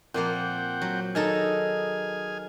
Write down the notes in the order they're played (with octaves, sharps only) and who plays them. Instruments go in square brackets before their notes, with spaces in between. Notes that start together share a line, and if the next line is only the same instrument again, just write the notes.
[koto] A#2 F3 A#3 [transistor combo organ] C4 F#5 G5
[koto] F#3
[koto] D#3 D#4 A4 [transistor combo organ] G#4 G#5 F6